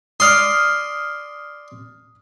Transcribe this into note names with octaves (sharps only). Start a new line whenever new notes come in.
D5 C6 D#6 F6